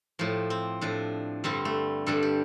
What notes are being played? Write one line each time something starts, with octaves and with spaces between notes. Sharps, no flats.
A2 F3 G4
C4
A2 F3 D4
G2 D3 G3 C4
A3
G2 D3 G3 A4
G4